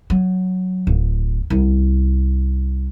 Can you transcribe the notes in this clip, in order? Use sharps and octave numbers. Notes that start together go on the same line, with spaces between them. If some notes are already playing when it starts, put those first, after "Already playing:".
F#3
D1
C2